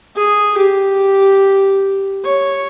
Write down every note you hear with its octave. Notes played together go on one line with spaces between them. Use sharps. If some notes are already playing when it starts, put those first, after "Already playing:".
G#4
G4
C#5